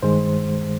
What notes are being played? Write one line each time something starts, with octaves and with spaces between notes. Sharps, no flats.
G2 D#3 G#3 C5